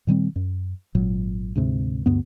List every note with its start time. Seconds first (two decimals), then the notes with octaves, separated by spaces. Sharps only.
0.07 A#2 D#3 G3 C4
0.36 F#2
0.95 G#1 A#2 F#3
1.56 D2 G#2 C3
2.06 D2 G2 B3